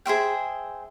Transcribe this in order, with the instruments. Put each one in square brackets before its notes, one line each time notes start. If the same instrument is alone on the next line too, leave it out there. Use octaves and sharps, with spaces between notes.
[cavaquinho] G#4 C5 E5 G5